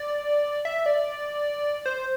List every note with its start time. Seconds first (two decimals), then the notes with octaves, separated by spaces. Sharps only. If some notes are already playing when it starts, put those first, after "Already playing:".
Already playing: D5
0.65 E5
0.86 D5
1.86 C5